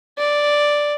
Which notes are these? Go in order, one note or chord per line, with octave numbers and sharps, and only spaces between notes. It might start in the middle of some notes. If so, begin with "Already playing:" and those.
D5